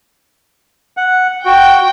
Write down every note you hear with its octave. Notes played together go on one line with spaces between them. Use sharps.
F#5
F#4 G5